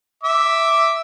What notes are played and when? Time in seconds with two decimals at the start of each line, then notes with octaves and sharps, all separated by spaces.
0.23 E5 D6